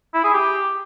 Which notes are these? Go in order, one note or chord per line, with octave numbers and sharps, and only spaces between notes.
E4
G#4
G4